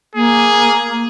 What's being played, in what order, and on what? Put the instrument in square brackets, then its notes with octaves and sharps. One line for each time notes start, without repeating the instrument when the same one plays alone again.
[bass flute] A#3 [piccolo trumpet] G#4